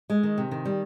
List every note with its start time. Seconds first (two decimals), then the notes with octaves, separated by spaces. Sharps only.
0.10 G#3
0.23 D#3
0.38 C3
0.51 D#3
0.65 G3